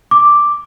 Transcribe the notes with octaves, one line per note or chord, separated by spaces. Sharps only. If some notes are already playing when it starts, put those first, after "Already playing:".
D6